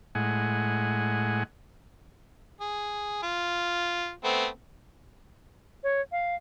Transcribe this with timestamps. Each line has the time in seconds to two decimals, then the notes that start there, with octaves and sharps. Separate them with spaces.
0.15 A2 G#3 F#5 G#5
2.61 G#4
3.23 F4
4.24 A3 B3 C4
5.84 C#5
6.12 F5